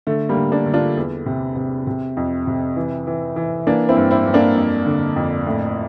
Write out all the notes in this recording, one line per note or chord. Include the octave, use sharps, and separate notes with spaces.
D3 A3
G3 A#3
D3
A#3 D4
D3
D4 F4
E2
C3
C3
C3
F2
C3
E3
E3
E3
E3 A#3 D4
C4 E4
G2
C4 E4
G2
A#3 D4
F2
D3
F2
A2